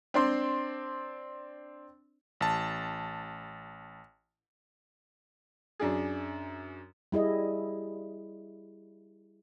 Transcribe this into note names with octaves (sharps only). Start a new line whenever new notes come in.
C4 D4 C6
A1 A5
F#2 D4 G#4
G3 E4 G#4 D#5